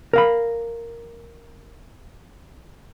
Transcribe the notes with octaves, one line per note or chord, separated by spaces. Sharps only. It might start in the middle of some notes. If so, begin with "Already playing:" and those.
A#4 F5 B5